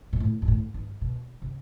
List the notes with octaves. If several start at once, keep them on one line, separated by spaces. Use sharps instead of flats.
B2
A2
G2
A2
G2
B2
C3